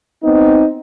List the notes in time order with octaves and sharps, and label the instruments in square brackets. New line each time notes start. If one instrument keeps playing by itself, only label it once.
[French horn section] B3 C4 D#4